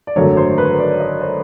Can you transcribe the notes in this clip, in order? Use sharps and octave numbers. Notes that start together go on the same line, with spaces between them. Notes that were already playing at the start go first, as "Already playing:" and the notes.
D5
G#1 F#2 D3 F#3 A3 C#5
C5
B4
D5
D#5
C5